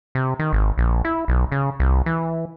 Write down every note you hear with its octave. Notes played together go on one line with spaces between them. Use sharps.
C3
D#3
G#1
A#1
E4
B1
C#3
C2
E3